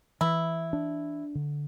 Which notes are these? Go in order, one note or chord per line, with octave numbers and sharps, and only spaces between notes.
E3 E4
D4
D3